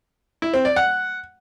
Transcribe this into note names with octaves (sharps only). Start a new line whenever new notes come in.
E4
C4
D5
F#5